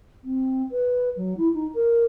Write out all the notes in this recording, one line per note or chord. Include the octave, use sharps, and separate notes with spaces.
C4
B4
F#3
E4
D#4
A#4